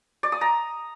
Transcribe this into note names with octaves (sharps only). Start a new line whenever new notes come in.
D5
D#6
A#5